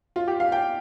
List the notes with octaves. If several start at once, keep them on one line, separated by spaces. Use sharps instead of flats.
F4
G4
F5
G5